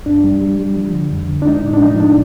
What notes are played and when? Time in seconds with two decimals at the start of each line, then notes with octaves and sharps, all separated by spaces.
0.06 G2 D4
0.24 G3
0.41 G3
0.59 G3
0.76 F3
0.94 D3
1.12 F2
1.29 D3
1.42 D4
1.47 G#3 D#4
1.64 A2
1.73 D4
1.82 F3 D#4
1.99 A2 D4